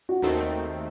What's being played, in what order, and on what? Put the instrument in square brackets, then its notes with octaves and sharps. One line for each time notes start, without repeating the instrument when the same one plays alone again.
[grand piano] F#4
[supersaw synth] D#2 D#3 A3 C4 [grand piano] D#4